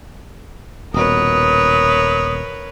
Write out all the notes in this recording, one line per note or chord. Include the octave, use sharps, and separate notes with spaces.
D#1 B2 A#4 B4 C#5 D#6